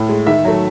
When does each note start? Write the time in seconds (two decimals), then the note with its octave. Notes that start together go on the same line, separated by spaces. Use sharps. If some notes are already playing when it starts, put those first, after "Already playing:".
Already playing: A2
0.09 G#3
0.27 D#3 E5
0.45 F#3 A3